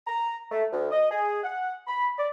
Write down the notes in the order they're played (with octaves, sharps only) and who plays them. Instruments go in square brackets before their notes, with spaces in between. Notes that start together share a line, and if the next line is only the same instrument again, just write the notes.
[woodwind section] A#5
A3
D2
D#5
G#4
F#5
B5
D5